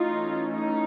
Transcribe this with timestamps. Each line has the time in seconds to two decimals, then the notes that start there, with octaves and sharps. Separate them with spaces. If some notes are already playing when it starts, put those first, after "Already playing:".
Already playing: E3 A3 C#4 D#4 F4
0.53 D#4